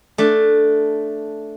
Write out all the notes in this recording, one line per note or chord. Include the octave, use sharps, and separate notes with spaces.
A3 D4